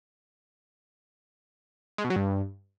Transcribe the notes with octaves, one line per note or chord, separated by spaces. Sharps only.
G#3
B2
F#3
G2